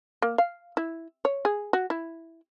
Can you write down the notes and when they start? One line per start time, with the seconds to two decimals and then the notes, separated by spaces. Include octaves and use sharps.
0.22 A#3
0.38 F5
0.77 E4
1.25 C#5
1.45 G#4
1.73 F#4
1.90 E4